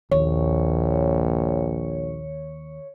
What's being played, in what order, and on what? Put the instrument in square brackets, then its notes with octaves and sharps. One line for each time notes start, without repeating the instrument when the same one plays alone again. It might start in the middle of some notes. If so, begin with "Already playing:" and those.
[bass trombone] A#1 [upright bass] D#2 [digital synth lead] C#5